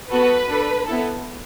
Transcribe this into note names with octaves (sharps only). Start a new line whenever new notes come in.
B3 F#4 A4 B4
D4 A4
B3 E4 A4